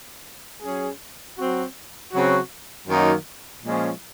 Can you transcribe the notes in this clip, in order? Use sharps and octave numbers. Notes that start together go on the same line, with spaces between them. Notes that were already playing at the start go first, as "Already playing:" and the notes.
F#3 C#4 G#4
F#3 C4 F#4
C#3 F#3 C4 F#4
F#2 D#3 F#3 A#3 D#4
A#2 F3 G#3 C#4